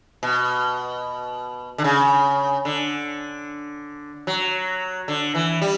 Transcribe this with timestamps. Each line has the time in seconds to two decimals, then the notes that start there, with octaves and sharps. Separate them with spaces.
0.23 B2
1.78 D3
1.84 C#3
2.65 D3
4.27 F#3
5.08 D3
5.35 E3
5.62 G3